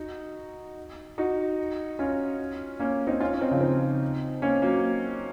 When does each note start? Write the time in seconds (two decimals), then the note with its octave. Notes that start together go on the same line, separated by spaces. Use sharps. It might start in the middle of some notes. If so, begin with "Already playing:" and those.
Already playing: D#4 F#4
1.18 D#4 F#4
1.99 C#4 F4
2.80 A#3 C#4
3.07 C4 D#4
3.21 C#4 F4
3.33 C#4
3.40 C4 D#4
3.51 C#3 F3
3.61 C4 D#4
4.42 A#3 C#4
4.62 F#3 A#3